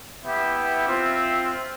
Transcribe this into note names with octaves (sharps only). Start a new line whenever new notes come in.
B3 E4 G4 E5
C4 F4